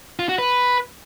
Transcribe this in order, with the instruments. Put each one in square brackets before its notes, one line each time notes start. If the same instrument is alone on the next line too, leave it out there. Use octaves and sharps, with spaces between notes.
[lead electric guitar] F4
F#4
B4